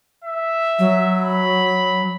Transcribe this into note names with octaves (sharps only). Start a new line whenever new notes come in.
E5
F#3
B5